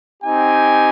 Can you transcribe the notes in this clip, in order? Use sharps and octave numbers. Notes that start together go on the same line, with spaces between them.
C4 D#4 G4 G#5